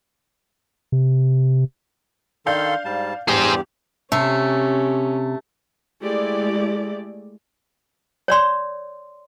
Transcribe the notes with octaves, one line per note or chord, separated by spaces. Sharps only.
C3
D#3 D4 A4 F5 C6 G6
G#2 G3 A5
E2 G2 G4 G#4 C5
C3 A3 C#4 G4
G#3 A3 E4 G4 D5
C#5 D5 C6